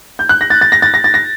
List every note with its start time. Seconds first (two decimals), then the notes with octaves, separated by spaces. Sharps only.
0.19 G6
0.29 F#6
0.41 A#6
0.50 A6
0.61 A6
0.72 A#6
0.82 A6
0.94 A#6
1.04 A6
1.14 A#6